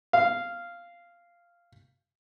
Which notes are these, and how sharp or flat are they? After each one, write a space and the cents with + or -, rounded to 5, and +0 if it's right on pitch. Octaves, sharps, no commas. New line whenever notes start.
F5 -10